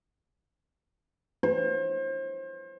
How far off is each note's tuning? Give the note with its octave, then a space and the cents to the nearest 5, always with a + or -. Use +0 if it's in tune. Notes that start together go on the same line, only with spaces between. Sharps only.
C5 +35